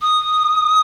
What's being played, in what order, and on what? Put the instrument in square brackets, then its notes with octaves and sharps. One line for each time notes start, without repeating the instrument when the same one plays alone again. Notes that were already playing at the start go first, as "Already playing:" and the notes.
[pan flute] D#6